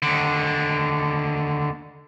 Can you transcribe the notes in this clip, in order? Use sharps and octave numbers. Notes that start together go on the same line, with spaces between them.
D#2 D3